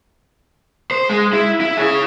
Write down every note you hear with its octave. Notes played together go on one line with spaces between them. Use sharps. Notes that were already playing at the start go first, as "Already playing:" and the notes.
C5
G#3
E4
E4
G#4 C#5